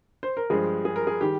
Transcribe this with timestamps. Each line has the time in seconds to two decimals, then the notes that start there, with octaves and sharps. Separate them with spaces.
0.23 C5
0.37 A#4
0.50 G2 F3 G#3 G#4
0.85 G#4
0.96 A#4
1.07 G#4
1.21 D#3 G3 G4